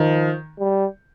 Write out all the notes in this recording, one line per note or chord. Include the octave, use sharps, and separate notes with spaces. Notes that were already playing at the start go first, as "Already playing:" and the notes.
Already playing: D#3 F3
G3